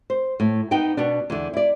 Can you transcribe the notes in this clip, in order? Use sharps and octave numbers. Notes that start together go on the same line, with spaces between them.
C5
A2
B3 D#4 G5
B2 B3 D4
E2 D3
E4 D5